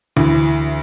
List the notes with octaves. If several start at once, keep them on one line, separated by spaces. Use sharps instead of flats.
D2 E3